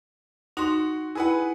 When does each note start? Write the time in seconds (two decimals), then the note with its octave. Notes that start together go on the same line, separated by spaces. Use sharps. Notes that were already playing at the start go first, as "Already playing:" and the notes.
0.57 D#4 F#4 C6
1.15 E4 G#4 B4 F#5